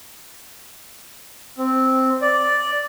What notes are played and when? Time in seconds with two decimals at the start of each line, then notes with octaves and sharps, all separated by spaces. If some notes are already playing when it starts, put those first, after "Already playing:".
1.58 C4
2.22 D5